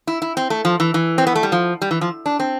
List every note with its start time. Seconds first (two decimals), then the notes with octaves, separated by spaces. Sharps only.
0.07 E4
0.22 E4
0.37 C4
0.50 A3
0.65 F3
0.80 E3
0.94 E3
1.18 C4
1.27 B3
1.35 A3
1.43 G3
1.52 F3
1.82 G3
1.91 E3
2.01 F3
2.26 D4
2.40 C4